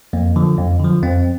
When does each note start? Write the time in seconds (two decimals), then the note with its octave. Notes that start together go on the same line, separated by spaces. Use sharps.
0.13 F2 A#3
0.36 D3 F3
0.58 F2
0.80 D3 F3
1.03 F2 C4